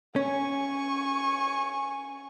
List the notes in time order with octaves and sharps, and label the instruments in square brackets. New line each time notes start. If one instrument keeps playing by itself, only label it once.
[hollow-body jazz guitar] C#4 [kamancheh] G#5 C#6